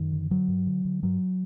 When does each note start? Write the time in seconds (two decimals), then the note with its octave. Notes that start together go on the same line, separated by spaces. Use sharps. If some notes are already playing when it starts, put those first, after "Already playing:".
Already playing: F#2 D#3
0.12 D3
0.30 D3 F#3
0.48 G2
0.67 D3
0.85 D3
1.03 G2 F#3